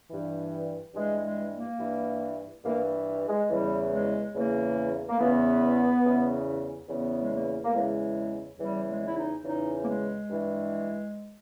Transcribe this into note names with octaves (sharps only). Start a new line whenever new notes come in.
G2 E3
G2 E3 G#3
G#3
A#3
G2 E3
G2 E3 A#3
G#3
E2 C#3 E3 G3
G#3
E2 C#3 E3 A#3
A#3
E2 C#3 E3 B3
E2 C#3 E3
E2 C#3 E3 B3
G#3
A#3
A#3
E2 C#3 E3 G#3
E2 C#3 E3 G3
G#3
E4
D#4
E2 C#3 E3 D#4
A#3
G#3
G2 E3